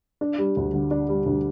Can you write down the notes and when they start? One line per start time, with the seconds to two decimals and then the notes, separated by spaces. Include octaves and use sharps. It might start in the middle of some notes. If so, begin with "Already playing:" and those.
0.21 D4
0.38 G3
0.57 D2
0.74 D3
0.91 D4
1.09 G3
1.26 D2